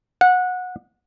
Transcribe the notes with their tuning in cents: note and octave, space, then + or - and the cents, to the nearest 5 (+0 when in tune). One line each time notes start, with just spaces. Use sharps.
F#5 -20